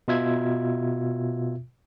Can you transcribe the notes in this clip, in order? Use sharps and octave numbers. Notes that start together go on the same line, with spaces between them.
B2 F4 E5 G#6